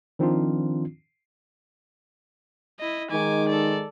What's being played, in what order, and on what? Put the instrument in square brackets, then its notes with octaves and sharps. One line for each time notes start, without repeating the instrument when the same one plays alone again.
[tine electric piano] D#3 F3 C4 D4 D#4 F4
[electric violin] E4 D#5
[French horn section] D#3 G#3 D#4 [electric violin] G#5 D6
[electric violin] A4 D5